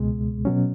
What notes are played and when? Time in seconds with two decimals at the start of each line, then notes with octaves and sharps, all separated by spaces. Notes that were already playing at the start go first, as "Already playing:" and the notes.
Already playing: C#2 B2 G#3
0.45 B2 F#3 C#4